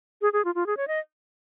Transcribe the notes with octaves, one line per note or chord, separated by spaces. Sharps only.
G#4
G#4
F4
F4
G#4
C#5
D#5